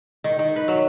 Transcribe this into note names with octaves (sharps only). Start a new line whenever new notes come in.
D#3
D#3
B4
F#3